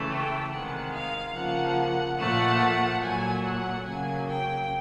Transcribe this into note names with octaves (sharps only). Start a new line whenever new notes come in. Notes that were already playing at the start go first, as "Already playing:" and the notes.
Already playing: C#3 E3 A3
G5
C3 D#3 G#3 F#5
F5
C#3 F3 A#3 F#5
A#2 F3 A3 F#5
A#2 F#3 A3 G#5
F#5
C#3 F#3 A#3 G#5
G5